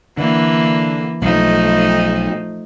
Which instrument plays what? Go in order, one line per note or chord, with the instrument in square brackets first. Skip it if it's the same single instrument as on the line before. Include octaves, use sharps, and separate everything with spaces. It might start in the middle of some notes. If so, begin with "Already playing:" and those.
[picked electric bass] D3 [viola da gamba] E3 A#3
[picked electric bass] B1 [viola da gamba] F3 A3 D#4